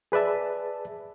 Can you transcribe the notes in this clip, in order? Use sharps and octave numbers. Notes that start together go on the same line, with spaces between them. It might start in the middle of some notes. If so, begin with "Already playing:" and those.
G#4 B4 D5 E5 A5